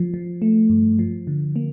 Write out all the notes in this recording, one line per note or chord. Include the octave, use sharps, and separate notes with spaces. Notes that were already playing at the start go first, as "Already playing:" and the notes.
Already playing: F3
F3
A3
G2
F3
D3
A#3